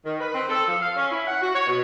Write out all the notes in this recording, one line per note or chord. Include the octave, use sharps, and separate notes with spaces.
D#3
B4
C4
A4
F3
F5
C#4
E4
F#5
F#4
C#5
B2